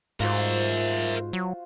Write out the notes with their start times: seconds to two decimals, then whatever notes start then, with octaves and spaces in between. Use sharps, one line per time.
0.20 G#2 F4 F#4 A#4 C5 E5
1.33 F#3